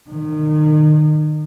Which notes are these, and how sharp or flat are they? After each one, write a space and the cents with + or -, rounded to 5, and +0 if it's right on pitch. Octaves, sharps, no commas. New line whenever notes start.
D#3 -30